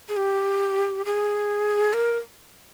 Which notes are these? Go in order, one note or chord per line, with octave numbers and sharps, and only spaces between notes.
G#4
G4
G#4
A#4